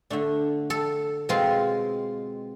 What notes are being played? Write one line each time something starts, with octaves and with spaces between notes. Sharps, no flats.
D3 A3 D4
A4
B2 G#3 C4 F4